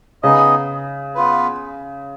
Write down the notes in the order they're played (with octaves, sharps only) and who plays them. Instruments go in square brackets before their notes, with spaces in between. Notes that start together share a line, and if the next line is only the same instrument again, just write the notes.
[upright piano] C#3 [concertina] B3 D#4 G#4 D#5
[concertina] B3 F4 B4